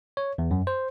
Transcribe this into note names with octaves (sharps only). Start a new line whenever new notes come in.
C#5
E2
F#2
C5